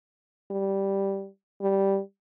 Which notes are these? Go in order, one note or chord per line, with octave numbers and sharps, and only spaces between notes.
G3
G3